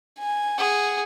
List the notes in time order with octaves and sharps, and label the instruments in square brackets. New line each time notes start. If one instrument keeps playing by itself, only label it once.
[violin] G#5
[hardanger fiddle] G#4 [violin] F#5